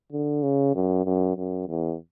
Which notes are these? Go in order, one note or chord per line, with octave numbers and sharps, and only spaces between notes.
D3
C#3
F#2
F#2
F#2
E2